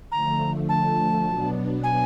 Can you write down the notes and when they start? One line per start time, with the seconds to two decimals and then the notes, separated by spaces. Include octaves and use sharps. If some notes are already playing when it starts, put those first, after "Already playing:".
0.12 D3 F3 A3 A#5
0.69 A5
1.26 B2 F#3 B3 D4
1.83 G#5